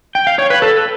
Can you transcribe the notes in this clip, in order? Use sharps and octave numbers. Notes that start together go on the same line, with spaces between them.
G5
F5
C#5
B4
A4